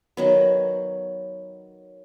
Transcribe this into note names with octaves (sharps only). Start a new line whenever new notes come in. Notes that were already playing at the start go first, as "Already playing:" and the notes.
D#3 F#3 B3